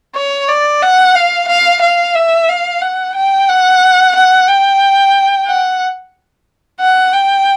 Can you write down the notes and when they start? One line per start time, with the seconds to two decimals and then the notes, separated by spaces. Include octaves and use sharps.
0.16 C#5
0.48 D5
0.82 F#5
1.15 F5
1.48 F5
1.81 F5
2.15 E5
2.48 F5
2.82 F#5
3.15 G5
3.48 F#5
4.15 F#5
4.48 G5
5.47 F#5
6.80 F#5
7.13 G5